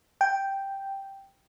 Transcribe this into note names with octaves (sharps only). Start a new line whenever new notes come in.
G5